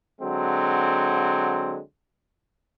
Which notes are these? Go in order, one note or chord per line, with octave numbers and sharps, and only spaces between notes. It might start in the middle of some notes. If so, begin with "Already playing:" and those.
D3 F#3 G#3 C4